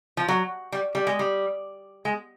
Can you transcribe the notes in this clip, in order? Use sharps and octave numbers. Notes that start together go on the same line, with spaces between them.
F3
F#3
G3
G3
G#3
G3
G#3